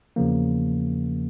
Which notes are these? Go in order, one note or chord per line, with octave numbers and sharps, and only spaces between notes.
E2 C#3 F3 A#3